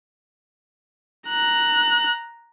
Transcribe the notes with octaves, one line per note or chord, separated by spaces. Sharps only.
A#5 F#6